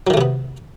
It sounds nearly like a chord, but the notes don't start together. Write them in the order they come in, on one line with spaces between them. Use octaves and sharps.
F#3 D#3 A3 C3 B3